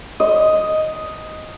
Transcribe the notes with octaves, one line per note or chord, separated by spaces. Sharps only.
D#5